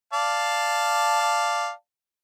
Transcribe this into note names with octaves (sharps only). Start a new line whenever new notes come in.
D5 F5 A5